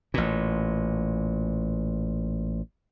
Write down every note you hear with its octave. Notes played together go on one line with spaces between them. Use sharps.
A1 A#2